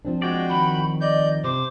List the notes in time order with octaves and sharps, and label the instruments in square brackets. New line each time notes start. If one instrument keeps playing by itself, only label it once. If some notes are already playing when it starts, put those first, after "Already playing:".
[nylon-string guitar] F3 C4 D4
[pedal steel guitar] G#3 D5 [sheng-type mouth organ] F#4 G5
[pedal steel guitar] D#3 [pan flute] B5
[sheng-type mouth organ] D5 G6 [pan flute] D#5
[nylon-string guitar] C3 [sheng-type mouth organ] C5 [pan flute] D6